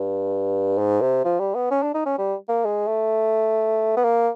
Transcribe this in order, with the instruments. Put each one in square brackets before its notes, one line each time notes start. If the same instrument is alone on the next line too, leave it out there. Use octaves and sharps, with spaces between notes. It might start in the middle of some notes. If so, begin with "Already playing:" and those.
Already playing: [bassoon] G2
G#2
C3
F3
G3
B3
C#4
D4
D#4
C#4
G3
A#3
G#3
A3
B3
A#3